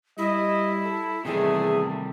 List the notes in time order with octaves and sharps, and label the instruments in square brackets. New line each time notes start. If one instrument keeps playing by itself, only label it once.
[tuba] G3 [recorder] E4 [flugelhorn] D#5
[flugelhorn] A4
[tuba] E2 [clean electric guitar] C3 D#3 G3 [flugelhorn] A3 [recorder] G#4